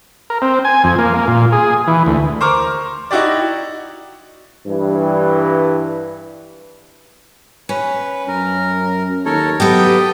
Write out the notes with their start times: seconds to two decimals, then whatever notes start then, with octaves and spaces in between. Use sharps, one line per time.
0.30 A#4
0.42 C4
0.65 G#5
0.84 F2
0.99 A#3
1.14 A#3
1.27 A#2
1.52 G#4
1.87 E3
2.06 D2
2.40 A#4 C5 A#5 C#6 D6 F6
3.11 D#4 E4 F#4 G4 D5
4.67 G2 E3
7.69 C#4 B4
8.28 F#2 A#4
9.25 D#2 A4 A#4 C#5
9.60 F#3 B3 G4 A4 D#5 G5